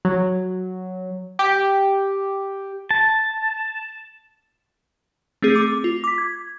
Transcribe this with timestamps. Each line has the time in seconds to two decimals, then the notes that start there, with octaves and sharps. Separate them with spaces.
0.05 F#3
1.39 G4
2.91 A5
5.42 A3 C4 G#4
5.55 D6
5.84 F4
6.04 D6 B6
6.18 G#6